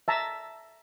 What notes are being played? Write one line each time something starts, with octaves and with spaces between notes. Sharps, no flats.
E5 A5 A#5